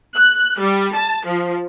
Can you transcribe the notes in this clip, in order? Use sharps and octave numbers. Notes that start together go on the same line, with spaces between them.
F#6
G3
A5
F3